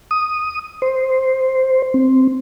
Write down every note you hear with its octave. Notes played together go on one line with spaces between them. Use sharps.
D#6
C5
C4